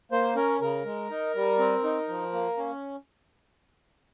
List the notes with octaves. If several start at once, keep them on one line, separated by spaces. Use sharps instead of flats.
A#3 C5
C#4 A#4
C#3 A#4
G#3
D#4
G3
C4
D#4
F3
A#3
C#4